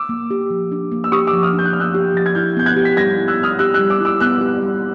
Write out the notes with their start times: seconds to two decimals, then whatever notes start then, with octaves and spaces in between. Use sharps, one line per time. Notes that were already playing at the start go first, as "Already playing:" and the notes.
Already playing: D6 E6
0.09 A#3
0.31 G4
0.50 F3
0.72 D4
0.92 A#3
1.04 E6
1.12 G4 C#6 D#6
1.27 D6 E6
1.33 F3
1.43 D#6 F6
1.53 D4
1.59 G6
1.66 F#6
1.73 A#3 F6
1.80 E6 F#6
1.94 G4
2.14 F3 A6
2.26 G#6
2.35 E4 F6 G6
2.57 B3 G6
2.66 F#6 G#6
2.76 G4
2.85 B6
2.97 G3 G#6 A#6
3.18 E4
3.28 E6 F#6
3.38 B3
3.43 D#6 F6
3.59 G4 E6 F#6
3.74 E6 F#6
3.79 G3
3.90 D6 E6
4.01 E4 D6 E6
4.20 B3 E6 F#6
4.41 G4
4.62 G3